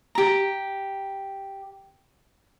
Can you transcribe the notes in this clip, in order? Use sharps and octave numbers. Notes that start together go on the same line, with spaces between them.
G4 A#5